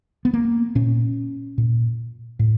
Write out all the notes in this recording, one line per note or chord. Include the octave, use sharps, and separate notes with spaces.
B3
A#3
A#2 C#4
A#2
A2